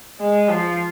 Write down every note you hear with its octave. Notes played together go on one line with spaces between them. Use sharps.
G#3
F3